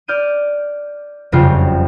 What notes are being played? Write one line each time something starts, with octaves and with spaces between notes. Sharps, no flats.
D5 F6 G6 D#7
F#1 F2 C#3 G3 F4 F5